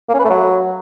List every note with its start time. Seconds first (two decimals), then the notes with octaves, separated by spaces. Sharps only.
0.09 A#3
0.14 C#4
0.19 B4
0.25 A3
0.30 F#3